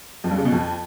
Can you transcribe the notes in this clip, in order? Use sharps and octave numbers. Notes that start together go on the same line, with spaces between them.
F2
G2
C#3
B2
F2